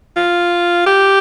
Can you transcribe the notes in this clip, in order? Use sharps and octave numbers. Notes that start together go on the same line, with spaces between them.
F4
G4